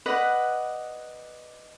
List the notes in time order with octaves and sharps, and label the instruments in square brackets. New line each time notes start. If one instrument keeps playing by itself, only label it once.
[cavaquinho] B4 D5 D#5 F#5